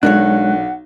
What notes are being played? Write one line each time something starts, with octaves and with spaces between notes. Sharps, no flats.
B1 G#3 D4 A#4 C#5 F#5 F#6